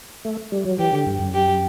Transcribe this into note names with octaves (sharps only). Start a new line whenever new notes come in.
A3
G3
F#3
E3 G4
D3
G2
F#2
G4